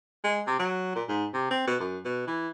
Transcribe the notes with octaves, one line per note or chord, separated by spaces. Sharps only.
G#3
C3
F#3
A#2
G#2
C3
C4
B2
F#2
B2
E3